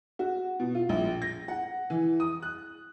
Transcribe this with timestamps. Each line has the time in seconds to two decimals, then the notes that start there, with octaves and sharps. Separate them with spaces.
0.19 F#4
0.60 B2
0.75 F4
0.89 A#1
1.22 A#6
1.48 F#5
1.90 E3
2.20 D#6
2.42 F#6